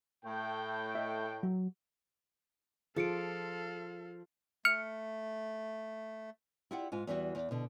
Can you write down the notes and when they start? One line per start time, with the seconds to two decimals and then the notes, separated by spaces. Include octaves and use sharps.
0.24 A2 A3 G5
0.95 D#5 E5
1.43 F#3
2.96 F3 F4 G#4 A4 F5 C#7 D7
4.65 A3 F6 C#7
6.71 E4 F4 G4 D5 F#5
6.92 G#2 F4 G#5
7.07 E2 E3 G3 F#4
7.35 E2
7.51 B2 D3